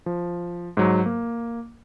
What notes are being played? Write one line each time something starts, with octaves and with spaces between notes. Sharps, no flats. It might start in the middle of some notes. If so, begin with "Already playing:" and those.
F3
G#2 F#3
A#3